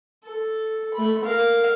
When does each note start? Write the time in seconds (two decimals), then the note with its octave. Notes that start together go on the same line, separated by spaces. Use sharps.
0.25 A4
0.94 A3 B5
1.25 A#4 F5